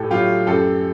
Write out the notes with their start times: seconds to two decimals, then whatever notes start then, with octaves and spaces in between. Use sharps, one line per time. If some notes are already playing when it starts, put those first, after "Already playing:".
Already playing: A2 G4 A4
0.11 F#3 A3 F4 G4
0.47 F#2 G4 A4